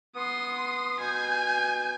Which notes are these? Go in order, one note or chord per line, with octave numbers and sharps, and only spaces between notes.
B3 C6 D#6
B2 G#5 G6